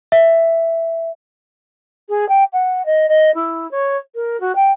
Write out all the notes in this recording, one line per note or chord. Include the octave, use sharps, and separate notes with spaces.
E5
G#4
G5
F#5
D#5
D#5
E4
C#5
A#4
F#4
G5